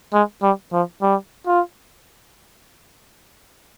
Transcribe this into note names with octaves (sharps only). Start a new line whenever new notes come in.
G#3
G3
F3
G3
F4